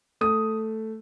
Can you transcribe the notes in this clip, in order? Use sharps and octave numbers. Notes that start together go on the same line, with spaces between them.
A3 D#6